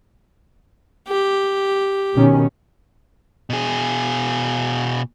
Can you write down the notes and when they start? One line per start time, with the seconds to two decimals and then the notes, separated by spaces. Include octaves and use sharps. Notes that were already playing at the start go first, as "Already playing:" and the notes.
1.08 G4
2.14 B2 D#3 C#4
3.50 B2 G#4